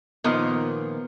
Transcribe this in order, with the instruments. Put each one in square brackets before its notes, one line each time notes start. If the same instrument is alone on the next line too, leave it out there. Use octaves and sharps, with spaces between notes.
[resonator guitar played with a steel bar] A#2 D#3 F3 [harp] B3 D#6 F6